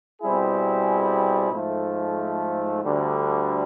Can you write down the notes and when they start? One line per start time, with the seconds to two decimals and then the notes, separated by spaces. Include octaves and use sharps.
0.22 B2 G3 C4 E4 G#4
1.51 G#2 F3 A3
2.82 D2 D3 G3